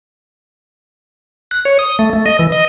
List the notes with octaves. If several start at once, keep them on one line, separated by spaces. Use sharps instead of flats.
F#6
C#5
D#6
A3
A3
D#5
E3
D#5